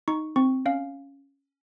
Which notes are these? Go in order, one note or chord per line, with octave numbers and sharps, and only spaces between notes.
D#4 C#6
C4 C#6
C#4 F5